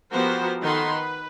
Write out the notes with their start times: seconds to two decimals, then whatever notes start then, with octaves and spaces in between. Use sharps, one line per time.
0.11 F3 B3 F#4 G4 A#4 C5
0.61 D#3 D#4 A4 F#5 B5 C6
0.92 B4